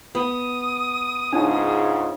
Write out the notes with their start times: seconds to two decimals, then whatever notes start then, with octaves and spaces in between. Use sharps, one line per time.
0.15 B3 D#6
1.33 C#2 G#2 C#3 D4 D#4